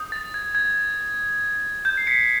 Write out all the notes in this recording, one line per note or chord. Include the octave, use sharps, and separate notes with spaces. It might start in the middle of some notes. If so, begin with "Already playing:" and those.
Already playing: D#6 G6
A6
G#6
G#6
G6
C7
B6 C#7